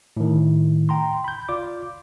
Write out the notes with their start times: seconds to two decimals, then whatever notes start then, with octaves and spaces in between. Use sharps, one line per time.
0.17 A2 D#3
0.89 G5 A#5 C6
1.24 B5 G6
1.49 F4 D5 D6